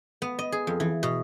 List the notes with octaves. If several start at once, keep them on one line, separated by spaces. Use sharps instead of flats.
B3
D#5
G#4
F2
E3
B2